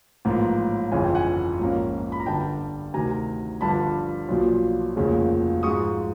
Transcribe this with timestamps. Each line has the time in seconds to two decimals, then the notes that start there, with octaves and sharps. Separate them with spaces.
0.25 A1 G#2 F3 A#3
0.92 G1 F2 C#3 E3 G#5
1.04 G5
1.15 F#5 G#5
1.59 A#1 G#2 F3 A#3 C#4
2.12 B5
2.20 A#5
2.26 G1 G2 D3 G5 A5
2.94 D2 C3 D#3 G#5 A#5
3.61 G1 G2 D3 F3 A5 B5
4.28 B1 A#2 F3
4.96 F1 D#2 C#3 F3 G#3
5.63 G#2 F3 G#3 C#6 D#6